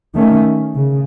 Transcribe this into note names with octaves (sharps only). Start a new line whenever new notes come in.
D#3 A3 C#4
C#3